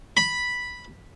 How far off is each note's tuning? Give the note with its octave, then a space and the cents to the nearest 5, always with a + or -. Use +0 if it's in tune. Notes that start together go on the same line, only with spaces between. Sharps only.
B5 -5